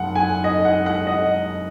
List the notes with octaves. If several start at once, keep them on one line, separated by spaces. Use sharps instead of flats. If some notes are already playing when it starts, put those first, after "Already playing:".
Already playing: F#1 F#5
G#5
D#5
F#5
F#5
D#5